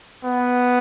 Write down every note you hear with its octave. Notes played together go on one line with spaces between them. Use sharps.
B3